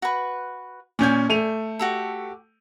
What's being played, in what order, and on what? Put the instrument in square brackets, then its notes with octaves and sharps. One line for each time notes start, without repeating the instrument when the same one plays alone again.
[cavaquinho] F#4 B4
[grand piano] A#2 C#4 G6 [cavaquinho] D5 G#5
[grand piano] A3 D#7 F7
[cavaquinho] F#4 G4 A4